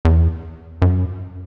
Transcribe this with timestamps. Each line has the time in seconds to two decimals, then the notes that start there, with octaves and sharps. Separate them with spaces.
0.05 E2
0.82 F#2